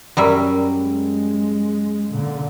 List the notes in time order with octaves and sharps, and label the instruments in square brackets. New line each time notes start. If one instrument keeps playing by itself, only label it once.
[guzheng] F#2 G3 E5
[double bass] G#3
A#2 D3